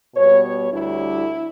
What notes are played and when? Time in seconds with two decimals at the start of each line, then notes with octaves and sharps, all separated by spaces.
0.15 B2 G3 B3 C#5
0.43 C#5
0.71 D2 D3 G3 D4 E4